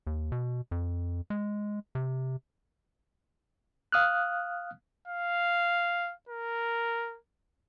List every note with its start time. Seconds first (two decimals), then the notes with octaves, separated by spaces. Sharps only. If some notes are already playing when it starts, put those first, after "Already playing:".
0.07 D#2
0.32 B2
0.71 F2
1.30 G#3
1.95 C3
3.92 F5 D#6 F6 F#6
5.08 F5
6.29 A#4